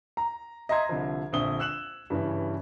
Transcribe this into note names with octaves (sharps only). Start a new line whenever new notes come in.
A#5
D#5 E5 A#5 C6 G#6
C2 D3 F3
A#1 D3 C4 E5 D#6 G7
E6 F#6 E7 F#7
G2 C#3 E3 C#4